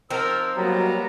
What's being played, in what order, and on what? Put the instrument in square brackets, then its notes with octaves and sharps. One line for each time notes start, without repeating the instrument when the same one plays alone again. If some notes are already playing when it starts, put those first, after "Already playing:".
[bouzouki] F3 C4 D#4 [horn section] A#4 [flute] E6
[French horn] F#3 [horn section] G3 A#3 B3 [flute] A#5